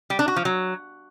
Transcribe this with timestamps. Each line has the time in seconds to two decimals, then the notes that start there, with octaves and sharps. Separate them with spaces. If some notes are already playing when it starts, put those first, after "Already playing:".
0.10 G3
0.19 D4
0.28 F#4
0.36 F3
0.45 F#3